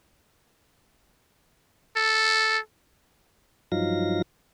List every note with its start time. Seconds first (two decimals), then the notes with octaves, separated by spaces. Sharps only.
1.96 A4
3.72 G2 F3 F#3 D#4 F5 A#6